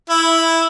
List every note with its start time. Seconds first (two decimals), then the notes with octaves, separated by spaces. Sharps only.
0.10 E4